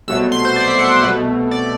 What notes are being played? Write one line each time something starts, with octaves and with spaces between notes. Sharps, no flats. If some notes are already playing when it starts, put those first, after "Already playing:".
C2 B2 F#3 A3 E6
C6
C5
D5
E5
F#5
C2 B2 A3 B4
D5